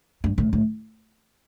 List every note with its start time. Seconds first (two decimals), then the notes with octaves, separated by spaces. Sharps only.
0.24 G2
0.38 A2
0.53 A2